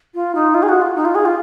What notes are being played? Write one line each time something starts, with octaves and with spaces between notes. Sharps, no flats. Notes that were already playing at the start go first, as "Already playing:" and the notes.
F4
D#4
F4
G#4
F#4
F4
D#4
F4
G#4
F4